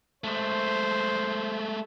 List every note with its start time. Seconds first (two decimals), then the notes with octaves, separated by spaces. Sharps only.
0.24 G#3 A3 C5